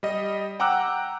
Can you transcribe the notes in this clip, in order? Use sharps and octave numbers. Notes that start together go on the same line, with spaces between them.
G3 D#5
F#5 G5 A#5 D6 E6 F#6